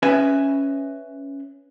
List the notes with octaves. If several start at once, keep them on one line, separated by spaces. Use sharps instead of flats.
C#4 B4 D#5 E5 G#5